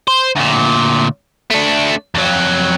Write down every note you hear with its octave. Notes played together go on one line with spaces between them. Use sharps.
C5
D2 A#2
A3 D4
F2 F#3